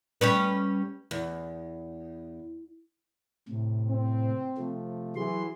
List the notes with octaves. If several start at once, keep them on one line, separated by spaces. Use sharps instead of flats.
G3 C#4 B4
E2
A2 C3
C4
C3 F3 A3
E3 F#3 G#4 C6